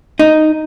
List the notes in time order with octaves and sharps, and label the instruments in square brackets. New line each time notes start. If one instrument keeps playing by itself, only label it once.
[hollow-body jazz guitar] D#4